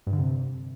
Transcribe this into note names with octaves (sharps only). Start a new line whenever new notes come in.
G2
D3
C3